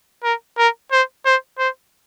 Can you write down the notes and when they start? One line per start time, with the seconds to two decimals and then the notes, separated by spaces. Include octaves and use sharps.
0.24 A#4
0.58 A#4
0.92 C5
1.26 C5
1.59 C5